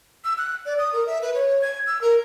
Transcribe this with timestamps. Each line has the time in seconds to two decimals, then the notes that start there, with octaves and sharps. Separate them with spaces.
0.24 E6
0.38 F#6
0.66 D5
0.78 D#6
0.93 A#4
1.07 E5
1.22 B4
1.35 C#5
1.62 G#6
1.87 E6
2.01 A#4